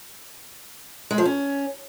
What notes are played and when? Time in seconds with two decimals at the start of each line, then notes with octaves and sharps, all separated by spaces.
1.11 G#3
1.18 F3
1.25 C#4